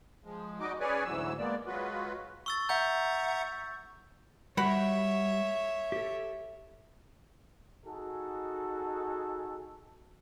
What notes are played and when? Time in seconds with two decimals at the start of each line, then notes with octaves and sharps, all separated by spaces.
0.24 F3 G#3
0.60 G3 D#4 F#4 D#5 D6
0.80 C#4 G#4 B4 C#5 D5 G#5
1.05 D2 G#2 E3 F#3 E6
1.39 G#3 A#3 B3 D5
1.66 F#3 G#3 F4 F#4 B4
2.46 C#6 E6 A6
2.69 E5 F#5 A#5 G6
4.57 G3 F#4 C#5 E5 F#5 B5
5.92 G4 A4
7.86 D#4 F#4 G#4 A4